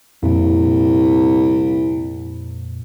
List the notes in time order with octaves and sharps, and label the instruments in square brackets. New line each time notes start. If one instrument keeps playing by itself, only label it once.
[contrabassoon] C2 [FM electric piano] F2 A#2